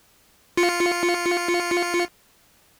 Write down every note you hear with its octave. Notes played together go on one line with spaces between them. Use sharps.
F4 C#7